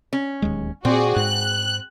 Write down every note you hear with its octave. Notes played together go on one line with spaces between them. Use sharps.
C#4
D1 D#2 G#3
A#2 C4 F#4 G#4 D5
G#2 F#6